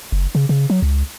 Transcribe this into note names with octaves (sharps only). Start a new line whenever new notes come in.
F#1
C#3
C#3
F#3
C#2